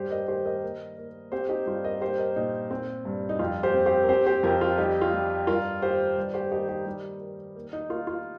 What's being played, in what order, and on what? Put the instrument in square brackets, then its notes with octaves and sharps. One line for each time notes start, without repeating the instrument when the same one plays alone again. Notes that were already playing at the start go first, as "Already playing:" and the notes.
Already playing: [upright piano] G2 G4 C5
A#4 D#5
D#3 G4 C5
A#4 D#5
A#3
A#3
C4 G4 C5
D#4 G4
G2 F4
A#4 D#5
A#3 G4 C5
A#4 D#5
A#2 D#4
C4
G2
D#4
F2 F4
G4 C5
C4
G4 C5
A#4
C4 G4 C5
G4 C5
F2 F4 A#4
F4 A#4
G3 D#4 G4
F4
G3
G2 F4 A#4
D#3 G4 C5
G2
G4 C5
D#3 D#4 G4
D#4 G4
G3 D#4
D#3
A#3
D#4
A#3 F4
F4